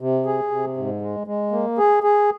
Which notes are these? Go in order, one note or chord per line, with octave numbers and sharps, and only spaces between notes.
C3
G#4
C3
G#2
G#3
G#3
A#3
G#4
G#4